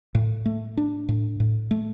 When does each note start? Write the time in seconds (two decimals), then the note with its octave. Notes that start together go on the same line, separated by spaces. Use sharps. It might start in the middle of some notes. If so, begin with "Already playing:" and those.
0.15 A2
0.46 A3
0.77 D4
1.09 A2
1.40 A2
1.71 A3